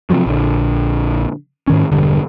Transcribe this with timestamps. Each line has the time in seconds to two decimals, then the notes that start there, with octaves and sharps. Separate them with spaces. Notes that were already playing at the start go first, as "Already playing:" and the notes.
0.10 C3 D#3 F3 F#3
0.26 A#1 D3
1.67 G#2 D#3 C#4
1.91 E1 G2 D3